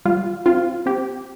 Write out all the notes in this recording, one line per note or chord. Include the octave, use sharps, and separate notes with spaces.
G3 F4
C4 F4
C4 G4